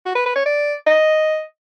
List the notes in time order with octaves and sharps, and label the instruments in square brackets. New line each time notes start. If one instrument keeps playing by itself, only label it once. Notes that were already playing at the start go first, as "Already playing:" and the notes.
[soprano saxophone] F#4
B4
B4
C#5
D5
D#5